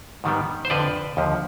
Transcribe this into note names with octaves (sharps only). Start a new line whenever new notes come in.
G#2 D#3 G3 B3
C5
F2 D3 F3 B4 D5
D#2 D3 F3